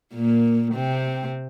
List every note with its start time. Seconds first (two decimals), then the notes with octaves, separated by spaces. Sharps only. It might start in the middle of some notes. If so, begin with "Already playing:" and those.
0.14 A#2 A#3
0.74 C3 C4